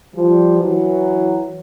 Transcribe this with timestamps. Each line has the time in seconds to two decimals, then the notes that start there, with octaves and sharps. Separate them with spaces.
0.14 F3 G3
0.59 E3 F#3